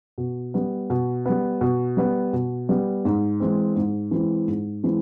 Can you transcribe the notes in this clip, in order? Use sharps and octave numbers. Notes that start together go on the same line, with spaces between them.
B2
G3 B3
B2
G3 B3
B2
G3 B3
B2
G3 B3
G#2
E3 G#3 C4
G#2
E3 G#3 C4
G#2
E3 G#3 C4